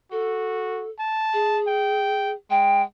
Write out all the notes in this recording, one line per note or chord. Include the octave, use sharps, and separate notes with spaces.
F#4 A4
A5
G#4
G5
G#3 G5